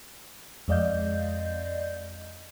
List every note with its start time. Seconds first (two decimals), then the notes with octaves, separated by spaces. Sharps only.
0.68 F2 G#3 D5 D#5 F5 G6